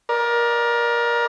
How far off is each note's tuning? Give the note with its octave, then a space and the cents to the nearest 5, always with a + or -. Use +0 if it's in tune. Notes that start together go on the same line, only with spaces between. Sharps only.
A#4 +25 D5 +10